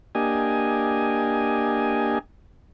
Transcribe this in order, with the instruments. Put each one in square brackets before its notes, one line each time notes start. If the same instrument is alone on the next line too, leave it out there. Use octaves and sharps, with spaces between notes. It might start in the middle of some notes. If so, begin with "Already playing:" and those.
[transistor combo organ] A#3 D4 G4 D#5 G#5